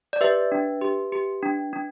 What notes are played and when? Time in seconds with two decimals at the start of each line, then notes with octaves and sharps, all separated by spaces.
0.13 D5
0.21 G4 B4 E5
0.52 D4
0.81 G4
1.12 G4
1.43 D4
1.73 D4